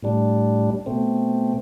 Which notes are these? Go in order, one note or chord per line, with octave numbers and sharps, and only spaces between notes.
A2 G3 D4
B2 A3 C4